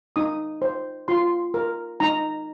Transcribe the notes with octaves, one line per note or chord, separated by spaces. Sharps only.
D#4 D#6
C5
F4 C6
A#4
D#4 A#5